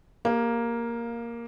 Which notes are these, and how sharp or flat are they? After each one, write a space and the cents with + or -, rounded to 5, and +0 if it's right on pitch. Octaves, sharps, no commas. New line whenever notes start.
A#3 +5 G4 +40 F5 +0